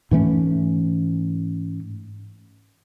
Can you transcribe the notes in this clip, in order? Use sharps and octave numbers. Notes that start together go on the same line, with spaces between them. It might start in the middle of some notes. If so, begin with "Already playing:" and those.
G#2 E3 A3 C#4